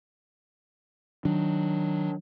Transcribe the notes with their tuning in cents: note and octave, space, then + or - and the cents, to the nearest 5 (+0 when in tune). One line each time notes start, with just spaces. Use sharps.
D#3 +0 F#3 -5 D4 +0